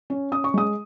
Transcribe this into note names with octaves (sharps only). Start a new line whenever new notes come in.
C#4
C#4 D#6
C#6
G#3 D#6